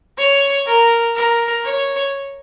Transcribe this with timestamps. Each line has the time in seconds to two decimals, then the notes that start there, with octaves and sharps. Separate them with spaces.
0.18 C#5
0.67 A#4
1.16 A#4
1.64 C#5